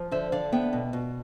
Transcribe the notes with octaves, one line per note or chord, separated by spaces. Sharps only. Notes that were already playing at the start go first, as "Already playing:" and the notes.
Already playing: F3
D3 C5 E5
D3 D5 F5
B3 E5 G5
B2
B2